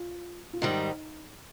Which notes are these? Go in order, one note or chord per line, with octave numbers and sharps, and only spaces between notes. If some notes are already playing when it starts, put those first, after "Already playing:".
Already playing: F4
F4
G#2 D#3 G3 D#4